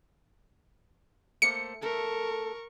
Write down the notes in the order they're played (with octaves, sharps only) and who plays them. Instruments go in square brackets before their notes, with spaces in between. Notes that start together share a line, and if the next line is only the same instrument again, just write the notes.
[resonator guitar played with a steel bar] A3 A#3 C5 [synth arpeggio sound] C#7
[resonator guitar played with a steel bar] A3 A4 [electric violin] A#4 C#6